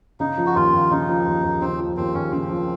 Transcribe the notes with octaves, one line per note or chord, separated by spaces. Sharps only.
C#3 D#4
F3
F#4
D#2 F4
D#2
C#3 D#4
F3
D#2
D#2
C#3 C4
F3
D#2 C4
D#2 C#4
C#3 C4
F3